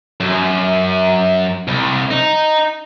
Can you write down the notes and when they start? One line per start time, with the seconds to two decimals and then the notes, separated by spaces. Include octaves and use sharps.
0.20 F#2
1.68 C2
2.11 D#4